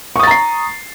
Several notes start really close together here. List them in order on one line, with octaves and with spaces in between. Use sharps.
C#6 D#6 A6 A#5 C7